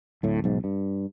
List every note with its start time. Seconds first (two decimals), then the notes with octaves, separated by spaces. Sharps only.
0.23 D1 A2
0.44 B1 G#2
0.64 G2